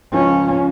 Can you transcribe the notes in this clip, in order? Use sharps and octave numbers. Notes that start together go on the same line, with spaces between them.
C#2 C#3 F3 C#4